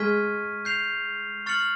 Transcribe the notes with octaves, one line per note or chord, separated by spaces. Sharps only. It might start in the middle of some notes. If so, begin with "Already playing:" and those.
Already playing: G#3 C#6 F6 G#6 B6 D#7
G6 C7 F7
C#6 F6 A6 C#7 F#7